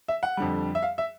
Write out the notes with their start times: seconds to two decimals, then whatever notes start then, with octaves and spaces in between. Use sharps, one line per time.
0.08 E5
0.23 F#5
0.37 F2 D3 G3
0.75 E5
0.83 F5
0.98 E5